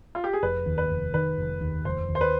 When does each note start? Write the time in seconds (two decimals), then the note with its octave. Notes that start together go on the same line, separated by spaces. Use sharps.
0.15 F4
0.24 G4
0.33 G#4
0.43 F1 B4
0.66 D#2
0.78 B4
0.90 F1
1.14 D#3 B4
1.38 F1
1.61 D#2
1.85 F1 C5
2.09 D#2
2.15 C5
2.21 B4